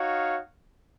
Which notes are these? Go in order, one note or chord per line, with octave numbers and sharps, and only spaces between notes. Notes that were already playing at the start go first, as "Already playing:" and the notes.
Already playing: D#4 F#4 C#5 F5